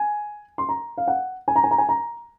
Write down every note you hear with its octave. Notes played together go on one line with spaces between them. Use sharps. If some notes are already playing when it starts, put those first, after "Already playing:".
Already playing: G#5
C6
A#5
F5
F#5
G#5
A#5
G#5
A#5
G#5
A#5